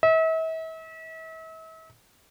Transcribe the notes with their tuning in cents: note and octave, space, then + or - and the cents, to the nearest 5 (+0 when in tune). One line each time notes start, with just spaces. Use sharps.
E5 -40